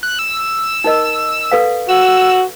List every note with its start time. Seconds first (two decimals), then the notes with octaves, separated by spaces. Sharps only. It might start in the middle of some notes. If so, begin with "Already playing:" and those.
0.03 F#6
0.19 E6
0.84 D#4 A#4 D#5
1.52 A4 B4 F5
1.89 F#4 E6